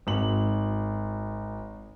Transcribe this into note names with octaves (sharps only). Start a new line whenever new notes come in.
G#1 F#7